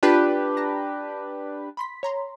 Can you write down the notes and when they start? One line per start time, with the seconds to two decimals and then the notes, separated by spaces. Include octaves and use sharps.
0.03 D4 F4 G4 B4
0.57 A5 A#5 A#6
1.77 B5 C6 B6
2.03 C#5 A#5 C6